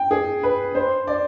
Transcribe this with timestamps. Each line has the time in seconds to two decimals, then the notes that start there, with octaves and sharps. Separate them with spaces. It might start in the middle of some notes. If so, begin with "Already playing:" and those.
Already playing: G5
0.11 G#4
0.43 B4
0.75 C5
1.07 D5